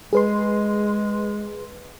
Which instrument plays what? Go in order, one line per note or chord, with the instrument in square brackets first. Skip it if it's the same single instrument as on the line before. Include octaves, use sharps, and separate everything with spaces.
[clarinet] G#3 [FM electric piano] G#4 B4 C6